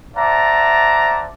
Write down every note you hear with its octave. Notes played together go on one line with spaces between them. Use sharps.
C5 D5 E5 F#5 A5 A#5